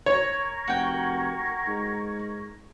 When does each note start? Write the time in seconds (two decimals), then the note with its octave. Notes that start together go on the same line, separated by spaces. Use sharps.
0.06 A#4 C#5 C#6 G#6
0.68 F1 F#4 G5
1.67 G#2